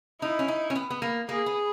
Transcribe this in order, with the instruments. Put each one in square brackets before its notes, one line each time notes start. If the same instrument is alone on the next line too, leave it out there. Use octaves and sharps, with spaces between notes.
[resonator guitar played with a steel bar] D#4 [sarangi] E4
[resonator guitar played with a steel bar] C#4
D#4
C#4
B3
B3
A#3
[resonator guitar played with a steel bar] A#3 [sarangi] G#4
[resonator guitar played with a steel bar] B3